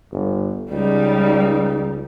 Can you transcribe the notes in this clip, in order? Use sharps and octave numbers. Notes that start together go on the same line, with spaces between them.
G1
C#2 G3 D#4